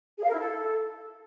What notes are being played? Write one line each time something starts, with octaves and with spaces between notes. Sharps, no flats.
G#4
F5
A#4
E4
A4